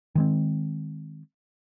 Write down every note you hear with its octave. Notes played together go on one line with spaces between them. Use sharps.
D#3 G#3 C4